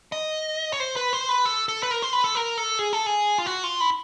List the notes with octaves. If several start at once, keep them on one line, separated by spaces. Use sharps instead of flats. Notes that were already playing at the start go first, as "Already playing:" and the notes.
D#5
C#5
C5
B4
C5
B4
A4
A4
B4
A#4
C5
B4
A4
A#4
A4
G#4
A4
G#4
F4
F#4
F4
E4